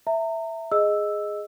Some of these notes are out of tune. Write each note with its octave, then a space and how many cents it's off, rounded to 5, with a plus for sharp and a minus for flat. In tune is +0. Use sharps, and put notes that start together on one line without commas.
E5 +0 A#5 -35
G#4 +0 D#5 +0 E6 +0